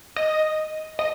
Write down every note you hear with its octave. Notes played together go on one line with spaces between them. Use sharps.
D#5
D#5